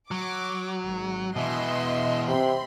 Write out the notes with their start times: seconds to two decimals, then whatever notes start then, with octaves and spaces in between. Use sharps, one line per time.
0.11 F#3 D6
0.84 G#1
1.36 B2 E3 D#5 E5 C6
2.28 C3 C4 B5 C6